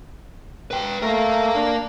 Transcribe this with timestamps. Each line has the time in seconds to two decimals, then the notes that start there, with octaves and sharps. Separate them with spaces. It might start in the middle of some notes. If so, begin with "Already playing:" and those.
0.71 B4 G5
1.02 A3 A#4 F5
1.54 D4